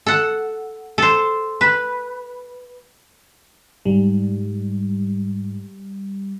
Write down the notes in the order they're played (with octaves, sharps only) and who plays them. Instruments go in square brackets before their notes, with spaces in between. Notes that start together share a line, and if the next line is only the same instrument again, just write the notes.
[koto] A4 F#5
A4 C5
B4
[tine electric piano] G#2 [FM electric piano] G3